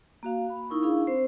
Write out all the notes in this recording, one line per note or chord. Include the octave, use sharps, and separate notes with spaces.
A#3 F#4 F5
B5
D#4 E4 A#4 C#6
D4 E4 G#4 F5
C4 C5